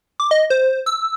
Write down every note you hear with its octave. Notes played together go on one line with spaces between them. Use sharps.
D6
D#5
C5
E6